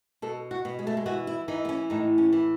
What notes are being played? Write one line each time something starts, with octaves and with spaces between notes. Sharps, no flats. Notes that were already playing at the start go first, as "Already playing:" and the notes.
B2 A4
F#4
B2
G#3
A3
G#3
E3 F#4
E4
E3 D#4
B3
C#4
A2 D#4
C#4
E3